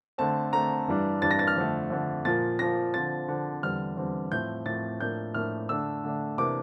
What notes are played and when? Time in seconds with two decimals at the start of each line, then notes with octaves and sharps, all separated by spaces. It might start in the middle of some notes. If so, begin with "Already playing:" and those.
0.18 D3 A3 C4 A5
0.53 D3 A3 C4 A#5
0.88 G2 E3 G3 D4
1.22 G2 E3 G3 D4 A6
1.31 A#6
1.39 A6
1.47 F6
1.56 F2 D3 A3
1.90 F2 D3 A3
2.25 A#2 F3 A#3 A6
2.59 A#2 F3 A#3 A#6
2.94 D3 F3 C4 A6
3.28 D3 F3 C4
3.63 E2 D3 G3 C4 F6
3.97 E2 D3 G3 C4
4.32 A2 F3 C4 G6
4.65 A2 F3 C4 A6
5.00 A2 F3 A#3 D4 G6
5.34 A2 F3 A#3 D4 F6
5.69 D3 A3 D4 E6
6.04 D3 A3 D4
6.38 C3 E3 A#3 D4 D6